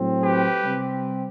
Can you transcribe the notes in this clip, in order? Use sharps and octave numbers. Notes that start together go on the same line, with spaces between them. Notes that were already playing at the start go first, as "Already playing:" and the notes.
Already playing: A2 F#3 C4
G4 B4
C3 G3 C4